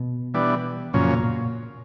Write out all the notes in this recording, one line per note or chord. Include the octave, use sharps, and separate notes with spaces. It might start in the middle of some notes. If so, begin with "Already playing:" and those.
Already playing: B2
E3 G3 B3 D4
F#2 A#2 C#3 F3 A#3 C#4
A#2